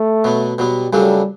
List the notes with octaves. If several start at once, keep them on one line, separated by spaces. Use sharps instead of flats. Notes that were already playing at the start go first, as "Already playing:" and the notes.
Already playing: A3
B2 F#3 B3
B2 F#3 G3 B3
F#2 C#3 F#3 G3 A3 D4